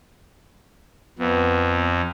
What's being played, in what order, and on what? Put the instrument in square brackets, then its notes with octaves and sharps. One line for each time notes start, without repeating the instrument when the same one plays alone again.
[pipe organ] F2 [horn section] B3